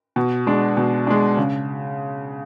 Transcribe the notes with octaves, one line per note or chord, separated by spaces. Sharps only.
B2
G#3 D4
B2
G#3 D4
C#3